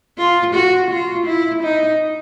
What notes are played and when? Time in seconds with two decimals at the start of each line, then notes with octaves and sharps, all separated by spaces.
0.18 F4
0.54 F#4
0.90 F4
1.26 E4
1.63 D#4